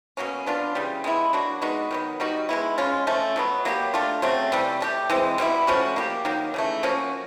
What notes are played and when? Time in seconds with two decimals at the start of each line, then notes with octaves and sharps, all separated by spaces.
0.17 B2 F#3 A#3 C#4
0.46 F#3 B3 D4 F4
0.75 C#3 E3 G3
1.04 G#3 B3 E4
1.33 F#3 A#3 D4 F#4
1.62 G#3 B3 D#4 F#4
1.91 D#3 F#3 B3
2.20 G3 B3 D#4 F#4
2.49 G#3 B3 E4
2.78 G#3 C#4 F4
3.07 F3 A3 C#4
3.36 B2 F#3 B3
3.65 F#3 A#3 D#4 G4
3.94 A3 D4 F4
4.22 C#3 F#3 A3 C4
4.52 C3 E3 G3
4.80 A3 D4 G4
5.10 E3 G#3 C4
5.38 B2 G3 C4 E4
5.67 F3 A3 C#4 F#4
5.96 A#3 D#4 G4
6.25 D#3 F#3 A#3
6.54 C#3 E3 A3
6.83 F3 A#3 C#4 F#4